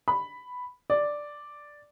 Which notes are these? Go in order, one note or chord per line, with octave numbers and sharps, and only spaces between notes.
B5
D5